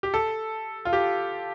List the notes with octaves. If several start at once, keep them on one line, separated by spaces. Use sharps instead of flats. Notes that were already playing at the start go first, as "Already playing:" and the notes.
G4
A4
F4
G4